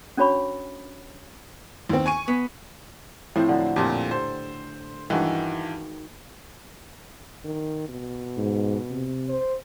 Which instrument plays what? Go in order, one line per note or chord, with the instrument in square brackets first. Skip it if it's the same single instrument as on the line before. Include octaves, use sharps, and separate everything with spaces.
[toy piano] C#4 D4 F#4 C#5 B5 C#6
[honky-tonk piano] D#2 C4
G#5 C#6 D#7
[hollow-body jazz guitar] B3
[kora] A2 [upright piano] F3 C4
[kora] D3 F#3
[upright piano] F2 A#2 [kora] G4
[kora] A4 [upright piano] C5
[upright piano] G2 E3 [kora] D#3 G#3 F#4
[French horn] D#3
B2
[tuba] G#2
C3
[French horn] C5